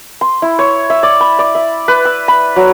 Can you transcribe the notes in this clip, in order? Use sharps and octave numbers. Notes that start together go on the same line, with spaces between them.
C6
E4
C#5
E5
D5
B5
D5
E5
B4
E6
B5
F#3